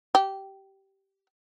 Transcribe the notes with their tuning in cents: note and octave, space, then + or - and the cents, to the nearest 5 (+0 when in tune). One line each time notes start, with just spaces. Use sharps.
G4 -15